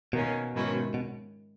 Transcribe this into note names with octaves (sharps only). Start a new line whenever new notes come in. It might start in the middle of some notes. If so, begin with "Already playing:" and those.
B2 D#3 A#3 C#4
G#2 D#3 F#3 C#4 E4
B2